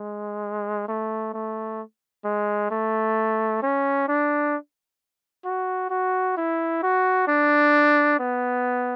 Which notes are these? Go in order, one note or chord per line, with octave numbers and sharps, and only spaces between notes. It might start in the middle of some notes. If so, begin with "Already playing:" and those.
Already playing: G#3
A3
A3
G#3
A3
C#4
D4
F#4
F#4
E4
F#4
D4
B3